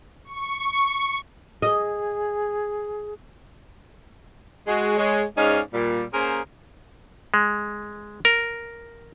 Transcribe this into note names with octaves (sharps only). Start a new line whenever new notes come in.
C#6
G#4 D#5
G#3 F#4
G#3 C#5
G#2 G#3 C#4 D#4 D5 F5
A#2 G3
A#3 C#4 G#4 A#4 C5
G#3
A#4